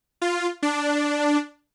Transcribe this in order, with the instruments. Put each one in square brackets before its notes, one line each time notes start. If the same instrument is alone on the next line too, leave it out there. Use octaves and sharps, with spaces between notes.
[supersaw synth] F4
D4